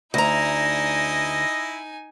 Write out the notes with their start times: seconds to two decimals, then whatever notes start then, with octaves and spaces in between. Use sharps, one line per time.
0.14 D2 D#4 E4 D#5 G#5 A#5 A#6